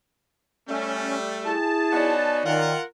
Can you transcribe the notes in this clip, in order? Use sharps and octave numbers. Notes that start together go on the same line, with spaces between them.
G3 A3 C#4
E4 G#4 A5
B3 D#4 F#4 C#5 D5 G#5
D#3 F4 A#4 F#5